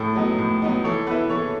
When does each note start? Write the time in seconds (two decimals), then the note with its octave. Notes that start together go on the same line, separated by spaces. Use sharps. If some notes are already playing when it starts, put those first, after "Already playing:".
Already playing: A2 A4
0.16 F#3 B3 D#4
0.38 A2
0.62 F#3 B3 D#4
0.84 E3 A4 C#5
1.07 B3 E4 B4
1.30 E3 A4 C#5